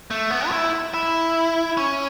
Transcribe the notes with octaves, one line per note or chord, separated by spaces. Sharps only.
A3
B3
F#4
E4
E4
C#4